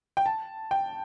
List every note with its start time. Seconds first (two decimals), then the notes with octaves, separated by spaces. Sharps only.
0.17 G5
0.26 A5
0.71 G5